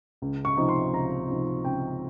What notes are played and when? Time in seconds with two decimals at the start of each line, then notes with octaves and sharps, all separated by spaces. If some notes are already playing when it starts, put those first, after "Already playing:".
0.22 C#2
0.45 C#6
0.57 C3 F3 C4 D#4
0.69 C6
0.93 C#2 A#5
1.29 C3 F3 C4 D#4
1.65 C#2 G5